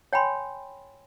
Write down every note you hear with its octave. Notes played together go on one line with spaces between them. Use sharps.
C#5 G5 G#5 B5 C6